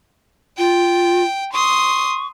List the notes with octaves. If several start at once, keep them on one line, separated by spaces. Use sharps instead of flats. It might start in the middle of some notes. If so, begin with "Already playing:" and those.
F4 G5
C6 C#6 D#6